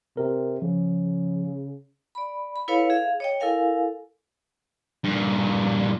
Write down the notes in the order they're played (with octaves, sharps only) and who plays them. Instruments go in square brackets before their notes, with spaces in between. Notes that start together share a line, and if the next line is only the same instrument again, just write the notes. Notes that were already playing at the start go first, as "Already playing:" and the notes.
[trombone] C3 [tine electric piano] A#4
[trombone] C#3 [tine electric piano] F3
[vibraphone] D5 B5
B5
E4 A4 B4 C#5 F5
G#4 E5 F5
C#5 D#5 G5
E4 A4 A#4 F5 G#5
[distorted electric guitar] G2 A#2